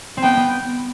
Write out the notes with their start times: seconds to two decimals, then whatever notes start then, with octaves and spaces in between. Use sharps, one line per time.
0.17 C4
0.23 B3 G5
0.37 B3